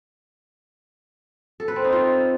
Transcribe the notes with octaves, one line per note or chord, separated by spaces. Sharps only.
A4
B4
C4
D#4
F4